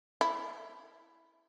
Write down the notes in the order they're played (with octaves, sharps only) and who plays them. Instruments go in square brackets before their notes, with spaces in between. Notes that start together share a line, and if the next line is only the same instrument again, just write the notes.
[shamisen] E4